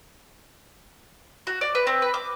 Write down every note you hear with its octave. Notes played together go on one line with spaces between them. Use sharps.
F#4
D5
B4
C4
B4
D6